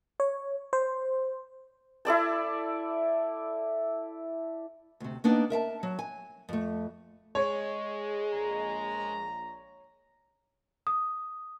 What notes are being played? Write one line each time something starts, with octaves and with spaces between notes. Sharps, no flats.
C#5
C5
E4 A4 D5 A5
D2 C3
A#3 B3 D4 D#4
A#4 E5 F5 A5
F#3
G#5
F2 A3
G#3 C#5
A#1 A#2 A#5
D#6